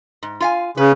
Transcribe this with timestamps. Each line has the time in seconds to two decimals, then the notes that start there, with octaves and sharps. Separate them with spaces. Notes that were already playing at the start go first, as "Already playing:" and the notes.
0.23 G#2
0.40 F4 F5 G#5
0.77 C#3 B4